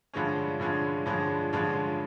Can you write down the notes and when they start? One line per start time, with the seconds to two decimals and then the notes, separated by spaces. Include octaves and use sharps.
0.13 G2 D3 F3 G#3 C#4
0.60 G2 D3 F3 G#3 C#4
1.06 G2 D3 F3 G#3 C#4
1.53 G2 D3 F3 G#3 C#4